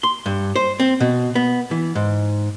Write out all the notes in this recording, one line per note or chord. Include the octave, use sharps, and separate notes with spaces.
C6
G2
C5
C4
B2
B3
E3
G#2